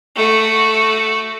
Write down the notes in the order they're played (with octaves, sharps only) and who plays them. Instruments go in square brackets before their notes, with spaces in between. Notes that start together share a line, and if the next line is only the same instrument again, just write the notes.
[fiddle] A3 F#4